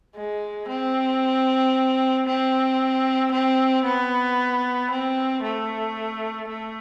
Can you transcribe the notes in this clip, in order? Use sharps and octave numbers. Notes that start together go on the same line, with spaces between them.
G#3
C4
C4
C4
B3
C4
A3
A3